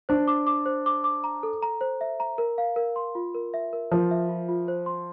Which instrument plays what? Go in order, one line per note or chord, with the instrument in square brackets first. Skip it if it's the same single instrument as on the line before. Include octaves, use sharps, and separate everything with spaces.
[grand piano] D4 [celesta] C5
[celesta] D6
D6
C5
D6
D6
A#5
A4
A#5
C5
E5
A#5
A#4
F5
A#4
C6
F4
A#4
E5
A#4
[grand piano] F3 [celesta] A#4
[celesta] E5
F4
F4
C5
C6